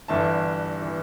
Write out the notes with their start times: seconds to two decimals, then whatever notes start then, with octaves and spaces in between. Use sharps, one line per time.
0.08 G1 G2 E3 E5 A5
0.82 E3